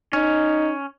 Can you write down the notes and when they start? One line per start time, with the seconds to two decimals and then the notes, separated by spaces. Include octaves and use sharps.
0.13 C#4 D#4